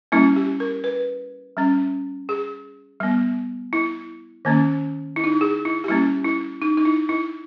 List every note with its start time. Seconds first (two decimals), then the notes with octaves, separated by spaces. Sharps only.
0.12 G3 A#3 C#4 E4
0.36 G4
0.60 A#4
0.84 B4
1.57 G3 C#4
2.29 G#4
3.00 G3 B3
3.73 E4
4.45 D#3 A#3 C#4
5.16 E4
5.24 D#4
5.32 E4
5.41 G#4
5.65 E4
5.84 G4
5.88 G3 A#3 C#4 E4
6.25 E4
6.62 D#4
6.77 D#4
6.85 E4
7.09 E4